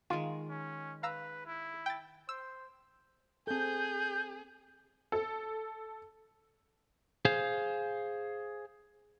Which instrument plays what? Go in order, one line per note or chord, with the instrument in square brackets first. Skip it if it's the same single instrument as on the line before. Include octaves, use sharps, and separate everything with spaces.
[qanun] D#3 G#3 [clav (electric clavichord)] F4
[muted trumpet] C#4
[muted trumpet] B4 [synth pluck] F5 A#5 E6
[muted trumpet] E4
[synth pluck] G5 A6
[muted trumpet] C5 [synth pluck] E6
[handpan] C4 A4 [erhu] G#4 [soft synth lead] G6
[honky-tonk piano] A4
[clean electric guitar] G#4 C5 F5